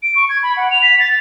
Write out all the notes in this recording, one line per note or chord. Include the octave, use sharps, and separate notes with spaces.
D7
C#6
G#6
B5
F#5
F7
B6
A6